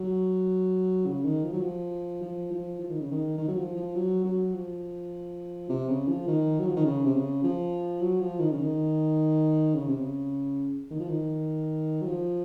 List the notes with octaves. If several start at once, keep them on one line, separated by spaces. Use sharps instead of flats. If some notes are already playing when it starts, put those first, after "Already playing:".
Already playing: F#3
C#3
D#3
F3
F#3
F3
F3
F3
F3
D#3
C#3
D#3
D#3
F#3
F3
F3
F#3
F#3
F3
C3
C#3
F3
D#3
F#3
F3
D#3
C#3
C3
C#3
F3
F#3
F3
D#3
C#3
D#3
C#3
C3
C#3
D#3
F3
D#3
F#3
F3